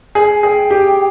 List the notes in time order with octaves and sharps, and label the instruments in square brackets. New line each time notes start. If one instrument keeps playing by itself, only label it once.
[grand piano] G#4 [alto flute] G#5
[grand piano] G#4 [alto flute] G5
[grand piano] G4